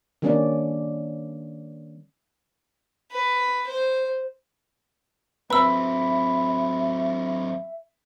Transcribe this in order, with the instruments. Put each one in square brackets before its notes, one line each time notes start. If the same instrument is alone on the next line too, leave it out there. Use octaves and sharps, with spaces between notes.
[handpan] D#3 G3 A#3 C#4 D4 D5
[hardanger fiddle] B4
C5
[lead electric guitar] F#3 C4 [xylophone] B4 E6 [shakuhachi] E5 [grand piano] B5